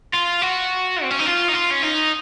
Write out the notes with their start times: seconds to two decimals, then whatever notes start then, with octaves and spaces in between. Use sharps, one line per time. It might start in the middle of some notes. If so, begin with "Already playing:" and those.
0.13 F4
0.41 F#4
1.03 C4
1.11 C#4
1.19 D#4
1.27 F4
1.49 D#4
1.55 F4
1.71 C#4
1.83 D#4